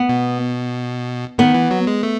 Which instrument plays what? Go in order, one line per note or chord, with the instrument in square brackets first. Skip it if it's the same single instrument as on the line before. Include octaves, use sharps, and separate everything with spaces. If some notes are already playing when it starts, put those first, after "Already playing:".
Already playing: [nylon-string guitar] B3
[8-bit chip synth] B2
[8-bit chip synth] D#3 [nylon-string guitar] B3
[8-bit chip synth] E3
F#3
G#3
A3